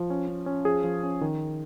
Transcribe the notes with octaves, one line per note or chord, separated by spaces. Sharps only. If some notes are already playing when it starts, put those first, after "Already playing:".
Already playing: F3
C#4
C#4
C#4
F3 G#4
F3
C#4
D#3